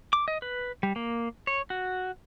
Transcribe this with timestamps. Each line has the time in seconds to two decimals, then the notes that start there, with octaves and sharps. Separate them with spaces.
0.13 D6
0.28 D#5
0.42 B4
0.83 G3
0.96 A#3
1.47 C#5
1.70 F#4